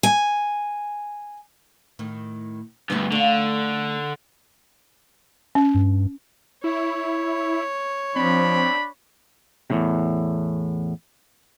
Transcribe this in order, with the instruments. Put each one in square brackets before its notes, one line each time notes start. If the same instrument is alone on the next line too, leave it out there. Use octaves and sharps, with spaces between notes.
[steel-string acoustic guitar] G#5
[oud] A2 D#3
[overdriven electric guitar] D2 G2 [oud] A3 B3
[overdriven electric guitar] D3 [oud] A3 F5
[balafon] C#4
[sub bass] G2
[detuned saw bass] E4 [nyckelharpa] C#5
[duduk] F3 [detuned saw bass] C4 [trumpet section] D4 B5
[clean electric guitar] E2 A2 C3